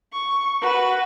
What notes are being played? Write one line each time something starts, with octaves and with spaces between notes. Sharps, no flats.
C#6
F#4 B4